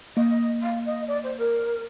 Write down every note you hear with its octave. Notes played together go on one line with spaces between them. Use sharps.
A#3 D#5
F5
D#5
D5
C5
A#4